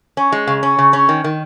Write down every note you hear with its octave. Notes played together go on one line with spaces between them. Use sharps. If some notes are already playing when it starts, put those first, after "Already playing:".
C#4
G#3
C#3
C#4
C#3
C#4
D#3
D#3